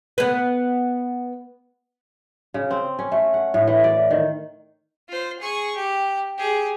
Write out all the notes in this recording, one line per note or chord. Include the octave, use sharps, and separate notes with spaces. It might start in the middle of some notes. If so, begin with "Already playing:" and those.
B3 B4
C#3
C4
C#4
A3
F#5
A2
E3
D5
D#3
F4 C5
G#4 C#6
G4
G4 G#4